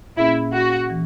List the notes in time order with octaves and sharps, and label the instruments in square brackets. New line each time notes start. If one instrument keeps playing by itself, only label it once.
[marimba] A#2 A#3 C#4 G#4 [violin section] E4
[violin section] F#4
[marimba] E3